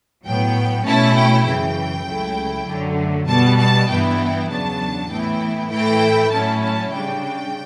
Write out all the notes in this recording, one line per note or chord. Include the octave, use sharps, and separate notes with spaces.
A2 F#3 B3 G5
B2 A3 C#4 E4 A5
G5
F#2 C#3 E3 G5
C#2 C#3 F#3 A3 E4
F#2 D3 F#3 A3
B2 G3 B3 A5
A5
G2 E3 B3 E4 G5
E2 C#3 F#3 B3 D4 A5
A2 E3 B3 E4 G5
A2 E3 A3 E4 G5
A2 F#3 C#4 E4 A5
A5
C#3 G3 D4 G5